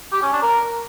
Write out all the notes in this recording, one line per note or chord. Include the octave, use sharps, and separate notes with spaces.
G4
C#4
D4
A#4